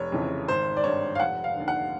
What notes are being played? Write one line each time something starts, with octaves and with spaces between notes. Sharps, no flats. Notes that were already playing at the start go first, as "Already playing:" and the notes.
Already playing: F1 C#5
F2 C#3 E3
G#1 C5
D5
G2 D#3 C#5
F5
F1 F#5
F5
D#2 D3
F#5